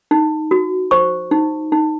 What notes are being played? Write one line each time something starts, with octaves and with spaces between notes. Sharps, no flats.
D#4
F#4
C5 C#6
D#4
D#4